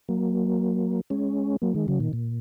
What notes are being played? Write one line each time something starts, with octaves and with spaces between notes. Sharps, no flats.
F#3 A#3
G#3 C#4
F#3 A#3
D#3 G#3
C#3 F#3
A#2 D#3
A#2